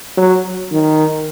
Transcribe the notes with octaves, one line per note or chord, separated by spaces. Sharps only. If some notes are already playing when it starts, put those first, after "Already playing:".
F#3
D#3